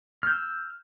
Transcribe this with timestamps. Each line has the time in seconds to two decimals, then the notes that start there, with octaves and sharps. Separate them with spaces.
0.23 F6
0.27 G6
0.31 E6